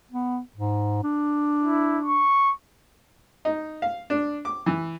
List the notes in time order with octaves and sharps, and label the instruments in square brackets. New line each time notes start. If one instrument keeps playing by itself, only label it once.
[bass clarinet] B3
G#2
D4
[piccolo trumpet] E4
C#6
[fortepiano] D#4
F5
D4
D6
E3